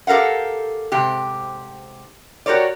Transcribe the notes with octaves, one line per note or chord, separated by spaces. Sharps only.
G4 A4 A#4 F5 F#5
G#2 C3 G4
F#4 G4 A#4 C#5 D5